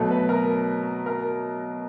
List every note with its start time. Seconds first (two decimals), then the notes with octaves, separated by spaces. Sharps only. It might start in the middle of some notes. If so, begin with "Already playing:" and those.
Already playing: B2 F#3 A3
0.11 B4
0.29 A#4
1.06 A#4